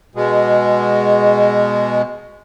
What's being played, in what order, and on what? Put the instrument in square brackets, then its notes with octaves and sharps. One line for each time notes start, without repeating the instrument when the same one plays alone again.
[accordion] B2 G#3